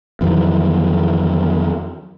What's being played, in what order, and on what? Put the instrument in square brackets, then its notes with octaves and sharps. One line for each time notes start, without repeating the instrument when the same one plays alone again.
[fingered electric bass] F2 D#3 E3 F#3